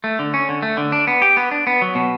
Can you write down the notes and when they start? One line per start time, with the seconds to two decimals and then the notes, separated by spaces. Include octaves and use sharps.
0.04 A3
0.19 D3
0.34 C#4
0.49 D3
0.63 A3
0.77 D3
0.92 D4
1.07 B3
1.22 G4
1.37 B3
1.51 D4
1.67 B3
1.82 F#3
1.95 B2